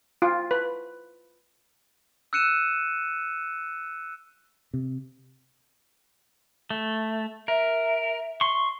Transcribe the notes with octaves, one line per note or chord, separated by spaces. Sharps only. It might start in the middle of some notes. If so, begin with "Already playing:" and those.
F4
B4
E6 F#6 C#7 D#7 E7
C3
A3
A#4 E5
C6 C#6